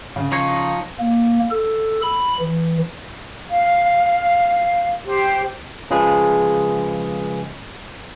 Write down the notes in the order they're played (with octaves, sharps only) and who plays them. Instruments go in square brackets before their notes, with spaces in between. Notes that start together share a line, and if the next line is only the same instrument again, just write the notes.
[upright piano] C#3
[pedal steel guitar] F3 D#4 C#5
[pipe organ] A#3
A4
B5
E3
[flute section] F5
G4 C5
[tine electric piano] C#3 F3 G#3 G#4 B4